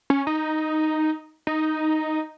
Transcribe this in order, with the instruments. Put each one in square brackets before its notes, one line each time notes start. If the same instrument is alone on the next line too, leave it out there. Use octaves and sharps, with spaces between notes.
[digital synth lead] C#4
D#4
D#4